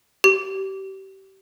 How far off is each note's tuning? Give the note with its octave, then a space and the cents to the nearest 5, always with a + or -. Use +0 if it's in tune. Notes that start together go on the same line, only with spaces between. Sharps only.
G4 -30